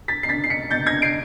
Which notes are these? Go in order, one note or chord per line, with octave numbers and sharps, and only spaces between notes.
A6 B6
C7
A6 B6
C7
B6 C#7
G6 A6
G#6 A#6
C7 D7